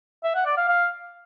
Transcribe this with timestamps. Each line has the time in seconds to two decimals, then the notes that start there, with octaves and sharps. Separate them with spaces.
0.24 E5
0.35 F#5
0.46 D5
0.57 F5
0.68 F5